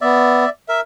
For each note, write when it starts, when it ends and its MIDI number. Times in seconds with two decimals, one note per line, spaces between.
0.01 0.45 59
0.01 0.49 74
0.01 0.49 76
0.69 0.81 70
0.69 0.80 76